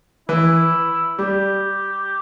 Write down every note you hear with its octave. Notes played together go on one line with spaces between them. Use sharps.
E3 E4
G3 G4